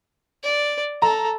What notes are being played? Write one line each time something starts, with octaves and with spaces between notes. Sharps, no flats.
D5
A4 A#5